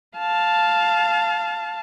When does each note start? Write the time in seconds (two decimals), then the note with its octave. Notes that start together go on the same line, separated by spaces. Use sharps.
0.18 F5 A5